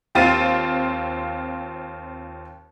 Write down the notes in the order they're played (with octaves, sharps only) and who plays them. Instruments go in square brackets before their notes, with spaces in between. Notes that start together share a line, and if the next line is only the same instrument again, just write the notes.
[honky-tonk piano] D#2 C4 F4 A6 D#7